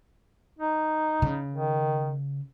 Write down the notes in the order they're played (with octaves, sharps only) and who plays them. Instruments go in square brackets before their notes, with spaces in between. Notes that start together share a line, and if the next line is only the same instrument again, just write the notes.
[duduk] D#4
[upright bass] C#3
[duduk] D#3